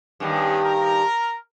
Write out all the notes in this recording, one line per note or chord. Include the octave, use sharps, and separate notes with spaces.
G2 D#3 B3 C#4 G#4
A#4 A#5